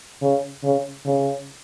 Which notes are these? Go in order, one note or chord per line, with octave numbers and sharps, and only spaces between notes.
C#3
C#3
C#3